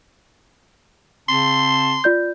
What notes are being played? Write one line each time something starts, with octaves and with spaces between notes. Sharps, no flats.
C#3 C4 A5 C6
F4 D5 G6